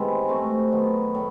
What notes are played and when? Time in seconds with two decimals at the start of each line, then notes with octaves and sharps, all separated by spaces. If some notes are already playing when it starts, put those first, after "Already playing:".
Already playing: G#2 C3 E3 G#3 B3
0.29 A3 C4 D#4 F#4
0.72 D#3 F#3 B3
1.15 A2